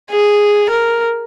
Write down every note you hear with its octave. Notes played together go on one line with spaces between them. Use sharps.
G#4
A#4